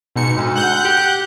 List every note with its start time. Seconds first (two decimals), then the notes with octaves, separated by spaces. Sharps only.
0.16 G#2 B2 C#7
0.37 D2 G#2
0.56 F#5 F#6 G6
0.84 G4